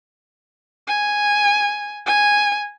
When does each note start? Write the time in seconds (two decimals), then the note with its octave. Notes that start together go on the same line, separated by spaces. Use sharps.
0.87 G#5
2.06 G#5